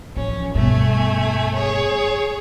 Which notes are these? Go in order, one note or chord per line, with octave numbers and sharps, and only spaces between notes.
A1 F3 C#4
G2 B2 A3 G#5
G#4 C#5